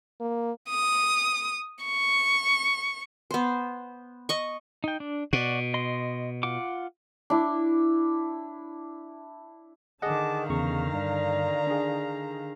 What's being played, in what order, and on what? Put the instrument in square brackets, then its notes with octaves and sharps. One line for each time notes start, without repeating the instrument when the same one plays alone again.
[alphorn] A#3
[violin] D#6
C#6
[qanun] B3 C5
D#5 C#6
[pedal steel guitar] D#4 G5
D4
[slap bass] B2 [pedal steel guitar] F#4 D5
[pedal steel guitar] D#5 C6
F4 F#5 D6
[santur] D4 E4
[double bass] D3 D#3 [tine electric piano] G#4 D#5 F#5 [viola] A5 D6
[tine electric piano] E2 C#3 C#6 [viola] F5 A#5
[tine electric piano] G2 [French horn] D5
[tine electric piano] D4 G#4